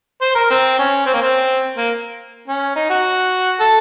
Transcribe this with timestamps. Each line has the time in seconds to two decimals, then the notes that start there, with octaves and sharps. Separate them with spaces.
0.21 C5
0.35 A#4
0.50 C4
0.79 C#4
1.06 C4
1.14 A#3
1.21 C4
1.77 A#3
2.48 C#4
2.76 D#4
2.90 F#4
3.60 A4